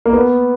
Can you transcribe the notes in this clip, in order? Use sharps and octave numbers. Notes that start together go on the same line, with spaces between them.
A#3
B3